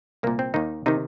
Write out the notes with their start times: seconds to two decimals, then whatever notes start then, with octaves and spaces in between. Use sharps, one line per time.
0.23 C2 A#2 A#3
0.39 C4
0.54 D#2 D#3 D#4
0.86 C3 D#3 D#4